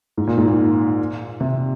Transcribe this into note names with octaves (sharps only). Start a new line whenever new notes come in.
G#2
A#2
G#2
A#2
C3